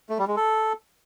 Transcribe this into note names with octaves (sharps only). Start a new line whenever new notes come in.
A3
G3
G#3
A4